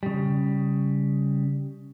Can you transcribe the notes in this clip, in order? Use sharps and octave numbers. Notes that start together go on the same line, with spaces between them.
C#3 G3